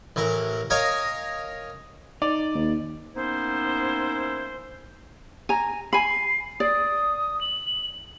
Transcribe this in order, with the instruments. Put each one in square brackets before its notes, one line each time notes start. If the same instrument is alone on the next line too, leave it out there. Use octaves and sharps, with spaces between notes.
[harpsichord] A1 E3 A#4
A#4 C#5 D#5 F5 G#5
[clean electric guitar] D#4 [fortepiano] D5
[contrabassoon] D#2
[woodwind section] A#3 B3 C#4 D#4 E4 C5
[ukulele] G#5 A#5
[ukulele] G#5 B5 [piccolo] C7
[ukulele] D5 [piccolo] D#6
[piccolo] F#7